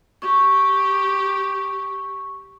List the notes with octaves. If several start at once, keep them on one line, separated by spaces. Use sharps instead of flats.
G4 C#6